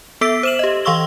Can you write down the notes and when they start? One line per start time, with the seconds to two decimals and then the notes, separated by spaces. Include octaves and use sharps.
0.21 B3 A4 E5 E6 B6 D7
0.43 C5 E7 F#7
0.59 G4 D#5
0.85 E3 F5 C6 C#6 E6 G7